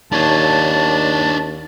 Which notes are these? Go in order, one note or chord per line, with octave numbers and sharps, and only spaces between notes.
D#2 D4 C#5 A5